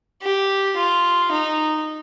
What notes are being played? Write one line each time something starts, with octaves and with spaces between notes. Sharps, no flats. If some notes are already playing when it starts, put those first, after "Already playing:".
G4
F4
D#4